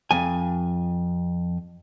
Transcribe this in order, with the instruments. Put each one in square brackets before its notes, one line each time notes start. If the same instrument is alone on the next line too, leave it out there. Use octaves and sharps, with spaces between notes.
[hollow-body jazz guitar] F2 G#5